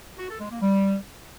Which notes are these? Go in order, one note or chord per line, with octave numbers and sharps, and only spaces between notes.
F#4
A4
G#3
A#3
G3